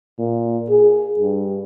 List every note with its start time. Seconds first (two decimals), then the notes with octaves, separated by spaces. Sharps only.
0.18 A#2
0.70 G#4
1.19 G2